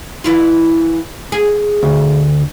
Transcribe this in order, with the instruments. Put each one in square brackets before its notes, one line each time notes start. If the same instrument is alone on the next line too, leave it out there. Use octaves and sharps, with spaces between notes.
[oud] E3 E4 F4
G#4
[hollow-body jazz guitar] D2